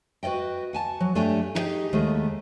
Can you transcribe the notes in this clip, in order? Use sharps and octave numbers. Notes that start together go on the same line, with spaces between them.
F#4 B4 D5 D#5 G5
F#5 G#5 A5
F#3
G2 A3 D4 G4 C#5 G#5
D#4 E4 G4 G#4 D#5 G5
D#2 G#3 A3